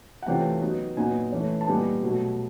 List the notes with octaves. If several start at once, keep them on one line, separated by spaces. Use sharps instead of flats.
F#5
C3 E3 A3 C#4 F4 G5
F#3 B3 D#4
A#2 F#3 B3 D#4 G#5
E3 A3 C#4
A5
A#2 G3 B3 D#4 G#5
B2 F#3 A3